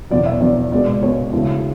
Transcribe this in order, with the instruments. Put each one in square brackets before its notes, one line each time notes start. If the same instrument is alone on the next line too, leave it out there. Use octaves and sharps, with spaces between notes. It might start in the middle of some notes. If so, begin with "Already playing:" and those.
[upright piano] E2 B2 F#3 D5
E5
E2 B2 F#3 D5
C#2 B2 G#3 D5
C#2 B2 G#3 C#5
D2 C#3 E3 A3